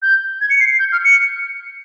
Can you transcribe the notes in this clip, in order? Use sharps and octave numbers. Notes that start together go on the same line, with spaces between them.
G6
G#6
C#7
C7
G6
F6
C#7